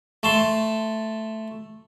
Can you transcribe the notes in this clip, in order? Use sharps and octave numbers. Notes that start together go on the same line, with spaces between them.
A3 A5 C6